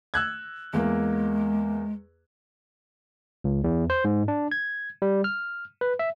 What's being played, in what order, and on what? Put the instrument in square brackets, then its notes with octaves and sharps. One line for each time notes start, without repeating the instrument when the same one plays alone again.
[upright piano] E6 F#6 G#6
[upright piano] E2 A#3 [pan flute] G#3
[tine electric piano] C#2
E2
C5
G#2
D4
G#6
G3
F6
B4
E5